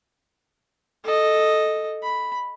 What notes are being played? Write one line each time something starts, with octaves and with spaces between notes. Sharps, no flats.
A4 D#5
B5